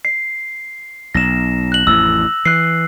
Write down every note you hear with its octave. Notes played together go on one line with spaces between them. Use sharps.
C7
B1 A#6 E7
F#6 F#7
A1 F2 E6
E3 F#6 C7